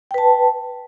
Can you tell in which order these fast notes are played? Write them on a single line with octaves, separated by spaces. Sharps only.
G5 B4 A5